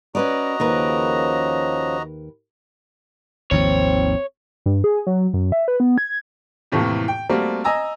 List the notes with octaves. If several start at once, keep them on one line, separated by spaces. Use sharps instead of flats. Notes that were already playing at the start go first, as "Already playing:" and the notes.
C#4 F#4 B4 D5 D#5 A#5
D#2 C#3 F3 A#4 B4
G#1 D#2 F3 C4 C#5
G2
G#4
F#3
F#2
E5
B4
B3
G#6
F2 A2 C3 E3 A3 A#3
G5
G3 A3 A#3 C4 F#4
D#5 G#5 A#5 E6